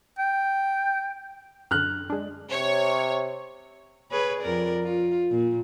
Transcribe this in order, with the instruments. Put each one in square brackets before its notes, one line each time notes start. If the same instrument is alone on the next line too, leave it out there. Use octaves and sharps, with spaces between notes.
[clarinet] G5
[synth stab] F#2 D3 [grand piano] F6 F#6
[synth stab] G#3 D4
[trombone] C3 [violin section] C#5
[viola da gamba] G#4 B4 C#5
F2 A#4 D5
F4
A#2